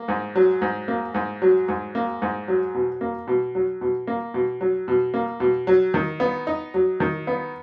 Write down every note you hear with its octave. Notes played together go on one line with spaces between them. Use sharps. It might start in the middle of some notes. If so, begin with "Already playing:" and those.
Already playing: A#3
G#2
F#3
G#2
A#3
G#2
F#3
G#2
A#3
G#2
F#3
B2
A#3
B2
F#3
B2
A#3
B2
F#3
B2
A#3
B2
F#3
D#3
B3
D#4
F#3
D#3
B3